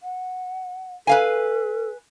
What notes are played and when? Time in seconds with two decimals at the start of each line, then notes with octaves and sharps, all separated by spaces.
0.03 F#5
1.07 A4 B4 F5 G#5